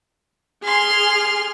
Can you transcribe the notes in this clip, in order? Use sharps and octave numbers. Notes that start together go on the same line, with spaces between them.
G#4 C6 F6